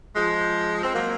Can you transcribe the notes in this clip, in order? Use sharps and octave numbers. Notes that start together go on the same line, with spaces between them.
F3 G#3
C4
F#3 A#3